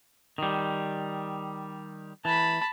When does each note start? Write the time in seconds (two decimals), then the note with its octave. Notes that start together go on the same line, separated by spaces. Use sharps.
0.38 D#3 G3
2.25 E3 A5 B5